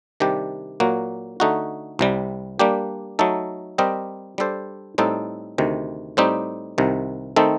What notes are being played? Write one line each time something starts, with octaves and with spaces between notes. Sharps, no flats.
C3 D#3 G3 D4 G4
A#2 F#3 A#3 F#4
D3 A3 D#4 F#4
C2 C3 G3
G3 A#3 D4 G4
F#3 A3 D#4 A4
G3 C4 G4 A#4 D#5
G3 D4 A4 C5
A2 G3 C4 D#4 A4
D2 C3 D#3
A2 G3 C4 D#4 G4
C2 C3 D#3
D#3 A3 C4 D#4 A4